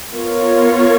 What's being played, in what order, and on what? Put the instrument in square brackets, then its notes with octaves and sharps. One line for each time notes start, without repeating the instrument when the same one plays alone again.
[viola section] B3 F4 A#4 C#5